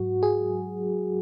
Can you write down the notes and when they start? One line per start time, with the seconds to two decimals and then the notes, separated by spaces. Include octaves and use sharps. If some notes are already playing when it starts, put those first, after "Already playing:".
Already playing: G#2 F#3 F#4
0.23 G#4